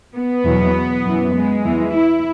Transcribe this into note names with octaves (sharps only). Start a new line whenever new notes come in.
B3
E2 B2 F#3
F#2 E3
G#3
E2 E3
E4